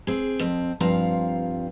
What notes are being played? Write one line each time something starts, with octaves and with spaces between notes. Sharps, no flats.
C4 G#4
F2 C4
G2 F3 C4 F5 A#5